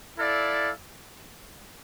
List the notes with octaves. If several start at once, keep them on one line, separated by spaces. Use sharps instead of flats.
E4 A4 D5 F5